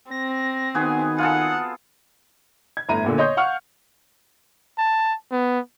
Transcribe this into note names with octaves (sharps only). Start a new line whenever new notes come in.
C4 A#6
D#3 B3 F#4 G#4 G#5
F4 G#4 A4 F#5
G#6
G1 A2 A#5 D#7
E2 A#2 D3
C#5 D#5 C6 G6
F5 F#5 C#6 F6
A5
B3